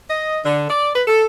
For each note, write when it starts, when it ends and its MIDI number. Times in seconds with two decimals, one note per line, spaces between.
0.09 0.38 75
0.44 0.65 50
0.69 0.90 74
0.95 1.02 71
1.07 1.24 69